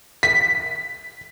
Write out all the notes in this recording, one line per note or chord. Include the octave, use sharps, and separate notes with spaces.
B6